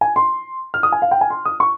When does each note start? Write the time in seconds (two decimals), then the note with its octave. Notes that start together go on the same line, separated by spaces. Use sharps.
0.01 G#5
0.16 C6
0.74 F6
0.83 D#6
0.92 G#5
1.02 F5
1.11 G5
1.21 G#5
1.30 C6
1.45 D#6
1.60 C#6